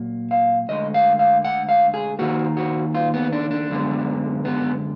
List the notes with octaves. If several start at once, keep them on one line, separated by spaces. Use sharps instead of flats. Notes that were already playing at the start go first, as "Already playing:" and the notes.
Already playing: A#2 F#3 A#3
F5
D2 D3 G#3 D#5
F5
F5
F#5
F5
G#4
D#2 D#3 A#3 F#4
F#4
F4
B3
D4
D4
F#2 D3 G#3 B3
B3